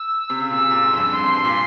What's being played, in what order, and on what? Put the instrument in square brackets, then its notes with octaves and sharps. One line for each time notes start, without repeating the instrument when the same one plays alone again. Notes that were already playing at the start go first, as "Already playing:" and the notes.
Already playing: [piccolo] E6
[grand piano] C3
C#3
[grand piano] A#2 [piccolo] E6
[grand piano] C3
A#2
G#2
F2
G2
[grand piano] F2 [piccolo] C6
[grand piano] F2
G2
A#2